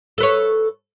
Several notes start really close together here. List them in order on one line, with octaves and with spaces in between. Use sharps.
A4 B4 C#5